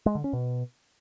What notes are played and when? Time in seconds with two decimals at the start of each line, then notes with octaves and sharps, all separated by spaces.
0.06 G#3
0.15 D3
0.24 C#4
0.33 B2